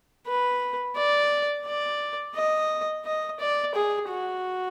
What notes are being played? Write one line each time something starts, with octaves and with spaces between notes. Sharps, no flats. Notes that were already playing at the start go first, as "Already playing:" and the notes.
B4
D5
D5
D#5
D#5
D5
G#4
F#4